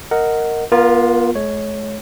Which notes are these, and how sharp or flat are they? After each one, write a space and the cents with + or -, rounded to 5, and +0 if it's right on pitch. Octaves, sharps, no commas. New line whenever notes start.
A#4 -10 D#5 +10 F#5 +0
B3 -35 F4 +0 A#4 +5
G#3 +40 C#5 +0